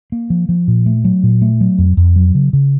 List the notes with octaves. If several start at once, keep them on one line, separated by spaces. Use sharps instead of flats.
A#3
F3
F3
A#2
A3
F#3
A#2
A3
F#3
F2
F2
F#3
C#3
C#3